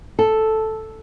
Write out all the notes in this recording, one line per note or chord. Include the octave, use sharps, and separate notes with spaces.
A4